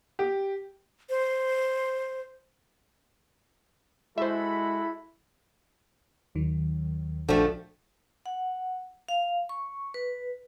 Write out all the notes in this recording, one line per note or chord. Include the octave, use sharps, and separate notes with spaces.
G4
C5
G#3 E4 F#4 A4 C5 E5 B5
D#2 D#3 F#3
A#1 D3 F3 A3 F#4 G5
F#5
F5
C#6
B4